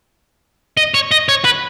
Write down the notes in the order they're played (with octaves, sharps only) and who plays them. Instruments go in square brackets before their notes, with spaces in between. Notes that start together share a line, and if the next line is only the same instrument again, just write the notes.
[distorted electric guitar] D#5
C#5
D#5
C#5
B4